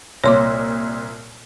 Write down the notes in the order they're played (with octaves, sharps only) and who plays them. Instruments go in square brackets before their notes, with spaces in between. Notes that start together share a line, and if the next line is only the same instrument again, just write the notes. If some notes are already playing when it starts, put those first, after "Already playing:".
[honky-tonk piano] C2 A#2 [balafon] C#5 C6 D6